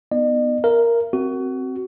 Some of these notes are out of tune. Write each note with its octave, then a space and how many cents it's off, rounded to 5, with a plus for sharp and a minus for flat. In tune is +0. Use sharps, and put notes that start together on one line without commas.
B3 +0 D#4 +0 D#5 -45
A#4 +0 E5 +40
C4 +0 F#4 +20